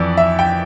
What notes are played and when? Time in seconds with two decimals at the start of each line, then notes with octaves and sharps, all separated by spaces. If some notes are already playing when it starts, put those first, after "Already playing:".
Already playing: F2 E3 D5
0.17 E5
0.39 G5